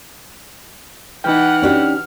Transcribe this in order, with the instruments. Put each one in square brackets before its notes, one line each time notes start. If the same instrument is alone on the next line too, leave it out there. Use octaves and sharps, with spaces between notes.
[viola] E3 F#5 [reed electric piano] D#4 G5 [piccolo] F6
[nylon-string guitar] C#4 D4 G4